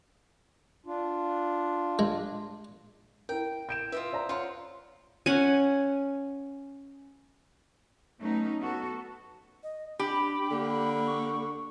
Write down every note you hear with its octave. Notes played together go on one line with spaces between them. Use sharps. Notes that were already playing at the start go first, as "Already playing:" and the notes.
D4 F4
G#3
E4 A#4 G5
G6 D7 E7
F4 B4 D#5 E5
C5 D5 A#5
F4 C#5 F#5 C6
C#4 F#5 G#5
F#3 A3 B3 C#4 D#4
B3 F#4 A4
D#5
D4 G4 B5
D3 A#3
C#6